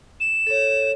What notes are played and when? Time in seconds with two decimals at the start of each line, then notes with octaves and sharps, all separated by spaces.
0.20 E7
0.47 A4 C#5